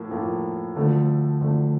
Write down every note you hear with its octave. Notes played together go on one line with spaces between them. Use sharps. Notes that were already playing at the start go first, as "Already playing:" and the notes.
Already playing: A2 F3 A#3
A2 F3 A#3
D2 D3 F3 A3
D2 D3 F3 A3